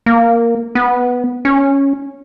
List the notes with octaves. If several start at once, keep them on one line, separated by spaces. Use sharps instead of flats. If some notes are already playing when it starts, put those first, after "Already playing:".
A#3
B3
C#4